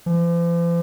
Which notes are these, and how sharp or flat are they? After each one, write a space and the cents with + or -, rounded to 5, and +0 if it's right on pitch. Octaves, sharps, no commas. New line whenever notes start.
F3 -45